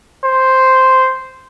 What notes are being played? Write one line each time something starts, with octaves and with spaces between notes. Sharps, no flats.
C5